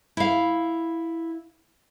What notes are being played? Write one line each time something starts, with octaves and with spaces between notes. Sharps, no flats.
E4 F5